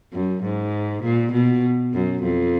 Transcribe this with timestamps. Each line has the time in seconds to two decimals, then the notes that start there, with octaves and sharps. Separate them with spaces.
0.13 F#2
0.43 G#2
1.03 A#2
1.32 B2
1.93 F#2
2.22 F2